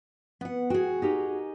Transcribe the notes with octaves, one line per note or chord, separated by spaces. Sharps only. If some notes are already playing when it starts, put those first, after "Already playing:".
B3 F#5
F#4 G#4 G5
D#4 G4 A#4